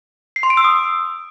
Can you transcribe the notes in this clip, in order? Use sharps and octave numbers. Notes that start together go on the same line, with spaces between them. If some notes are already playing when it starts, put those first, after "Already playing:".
C7
C6
D7
E6
D#6